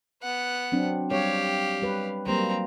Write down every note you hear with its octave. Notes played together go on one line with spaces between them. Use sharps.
B3 F#5
F#3 C4 D4
G3 G4 C#5 F5
G3 B4
F#3 G3 A#3 C4 A#5